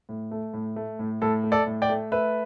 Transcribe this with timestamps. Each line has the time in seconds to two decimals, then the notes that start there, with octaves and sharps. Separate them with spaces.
0.09 A2
0.31 A3
0.54 A2
0.76 A3
0.99 A2
1.22 A2 A4
1.44 A3
1.52 A4 D5
1.66 A2
1.82 D5 G5
1.89 A3
2.12 A3 B4 E5